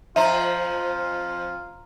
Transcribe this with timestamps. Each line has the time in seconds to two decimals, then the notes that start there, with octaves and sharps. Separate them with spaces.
0.16 F2 F3 F4 C5 E5 A#5 D#7